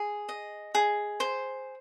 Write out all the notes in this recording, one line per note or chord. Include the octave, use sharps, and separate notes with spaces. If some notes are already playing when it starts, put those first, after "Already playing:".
Already playing: G#4
D#5
G#4
C5